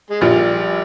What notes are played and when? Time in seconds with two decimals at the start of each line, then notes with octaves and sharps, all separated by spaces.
0.10 G#3
0.21 A#1 A#2 E3 G3